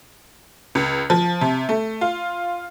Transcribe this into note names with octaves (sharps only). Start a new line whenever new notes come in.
C#2
F3
C3
A3
F4